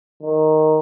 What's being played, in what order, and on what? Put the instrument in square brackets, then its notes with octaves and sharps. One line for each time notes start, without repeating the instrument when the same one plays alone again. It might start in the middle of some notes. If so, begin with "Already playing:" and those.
[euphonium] D#3